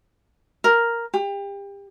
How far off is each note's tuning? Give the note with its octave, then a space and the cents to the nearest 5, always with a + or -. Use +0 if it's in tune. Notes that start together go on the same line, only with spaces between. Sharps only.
A#4 +0
G4 +30